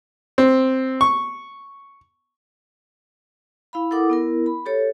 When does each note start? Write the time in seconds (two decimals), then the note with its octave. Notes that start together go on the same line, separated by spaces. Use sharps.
0.38 C4
1.01 C#6
3.73 E4 F5 B5
3.91 E4 A4 A#4 F#5 D6 D#6
4.10 B3 E4 A#4
4.46 B5
4.66 G4 A4 C#5